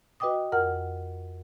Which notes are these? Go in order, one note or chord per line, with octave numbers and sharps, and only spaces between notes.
F#4 B4 D#5 G5 D6 D#6
F2 A#4 F#5 F6